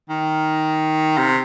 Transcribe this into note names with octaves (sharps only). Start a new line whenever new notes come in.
D#3
C3